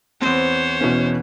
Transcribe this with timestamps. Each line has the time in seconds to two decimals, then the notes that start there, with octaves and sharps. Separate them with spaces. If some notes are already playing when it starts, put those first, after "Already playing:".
0.21 E2 C4 C5 C#5
0.81 B2 E3 C#4